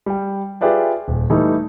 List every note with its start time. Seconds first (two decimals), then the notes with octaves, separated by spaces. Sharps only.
0.06 G3 G5
0.61 F4 G4 G#4 B4 D5 E5
1.08 D#1
1.30 E3 G3 A3 D#4